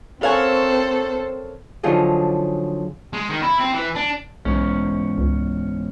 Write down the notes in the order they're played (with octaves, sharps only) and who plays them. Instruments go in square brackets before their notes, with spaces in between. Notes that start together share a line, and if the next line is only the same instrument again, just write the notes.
[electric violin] C4 C5 [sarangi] A4 [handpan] A#4 C#5 [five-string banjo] F5 F#5 G#5
[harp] D3 F3 F#3 D#4 F4 G#4
[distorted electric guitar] G#3
D#3
E4
C4
E3
D4
[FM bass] B1 [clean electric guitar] E2 G#2 C#4
[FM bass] C#2